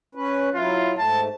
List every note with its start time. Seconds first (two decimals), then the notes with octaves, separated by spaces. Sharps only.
0.15 C#4 B4
0.54 F#3 E4 F4
0.98 G#2 A3 A5